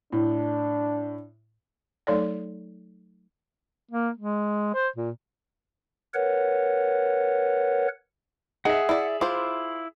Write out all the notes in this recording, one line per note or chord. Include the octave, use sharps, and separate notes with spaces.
A2 D4
F#3 A3 D#4 A4 C#5 D5
A#3
G#3
C5
A#2
A#4 B4 C#5 F#5
D#4 G#4 E5 F#5
E4 D5
E4 F4 C5 D6